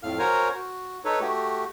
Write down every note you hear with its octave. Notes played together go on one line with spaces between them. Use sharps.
F2 A2 F5 F6
F#4 A#4 C5 C#5 G#5 A#5
F#4
D#4 A4 B4 C#5
A3 F#4 G4